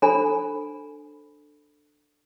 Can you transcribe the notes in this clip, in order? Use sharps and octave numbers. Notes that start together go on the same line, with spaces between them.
D4 A4 C5 G#5 A#5 B5